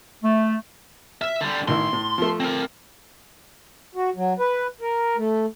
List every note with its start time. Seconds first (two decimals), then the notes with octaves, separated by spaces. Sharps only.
0.23 A3
1.22 E5 F6
1.41 D3 G3
1.68 A1 D#3 E4 C6
1.93 A2
2.18 F3 A3
2.40 C4 A#4
3.95 F#4
4.16 F#3
4.39 B4
4.81 A#4
5.17 A3